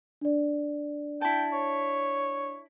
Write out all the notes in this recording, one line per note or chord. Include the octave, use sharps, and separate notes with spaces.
D4 D5
E4 G5 A5
C#5